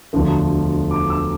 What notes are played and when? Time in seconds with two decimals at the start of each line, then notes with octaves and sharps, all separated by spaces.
0.13 E1 D2 D3 F3 A3
0.91 D6
1.10 E6